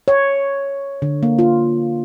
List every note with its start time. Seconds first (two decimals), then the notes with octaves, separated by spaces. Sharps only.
0.08 C#5
1.02 D3
1.23 A#3
1.39 F4